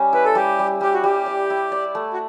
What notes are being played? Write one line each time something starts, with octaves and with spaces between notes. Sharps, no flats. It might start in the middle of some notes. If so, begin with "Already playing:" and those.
Already playing: G3 C#4
E4 B4
A4
G3 G4
G3
G3 G4
F#4
G3 G4
D5
E4
D5
A3
F#4